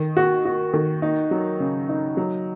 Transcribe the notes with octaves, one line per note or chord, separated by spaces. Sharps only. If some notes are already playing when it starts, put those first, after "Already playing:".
Already playing: D#3
F#4
F#4
D#3
D#4
F#3
C#3
D#4
F#3